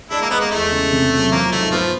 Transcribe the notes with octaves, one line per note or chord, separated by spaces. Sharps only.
G#3 D4 E4
A#3
G#3 B3
A#3
E2 A3
C#3
C3
F#3
F3 A#3
G#2 A3
F3 B3